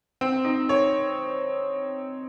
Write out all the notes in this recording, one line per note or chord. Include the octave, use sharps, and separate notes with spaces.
C4
D#4
C#5